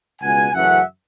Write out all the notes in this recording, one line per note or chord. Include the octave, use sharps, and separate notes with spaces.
C#2 B2 G#3 F#5 G#5
F#2 C#3 E3 A3 C#4 E5 F#5